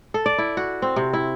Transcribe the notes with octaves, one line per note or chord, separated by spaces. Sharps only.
A4
D5
E4
F#4
C4
C3
E4